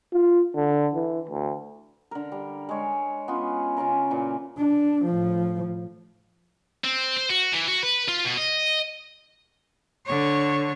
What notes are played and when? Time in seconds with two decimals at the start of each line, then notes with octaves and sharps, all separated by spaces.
0.13 F4
0.56 D3
0.95 E3
1.30 D2
2.11 D3 A#4
2.32 G3
2.69 G#3 C#5
3.28 B3 C#4 F4
3.77 C#3 C#4 F4 A#4
4.10 A#2 E3
4.58 D4
5.05 A2 F3
6.84 C4
7.17 C5
7.30 F#4
7.53 E3
7.68 F#4
7.83 B4
8.08 F4
8.25 B2
8.37 D#5
10.06 D3 C#5